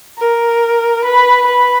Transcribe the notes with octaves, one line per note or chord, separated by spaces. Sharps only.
A#4
B4
B4